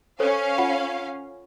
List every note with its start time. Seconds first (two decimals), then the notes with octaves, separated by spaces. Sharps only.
0.20 C#4 A4 C5 C#5 F5
0.58 F4 F#5 B5